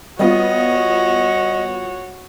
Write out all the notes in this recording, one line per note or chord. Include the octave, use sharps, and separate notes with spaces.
G3 B3 F4 F#4 C#5 D#5